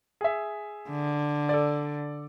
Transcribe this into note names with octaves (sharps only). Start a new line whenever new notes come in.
G#4 E5
D3
A4 D5